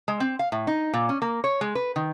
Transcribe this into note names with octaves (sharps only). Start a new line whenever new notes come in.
G#3
C4
F5
A2
D#4
A#2
C#4
A#3
C#5
G#3
B4
D#3